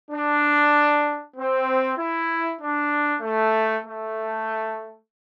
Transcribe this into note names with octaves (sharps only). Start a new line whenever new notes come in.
D4
C4
E4
D4
A3
A3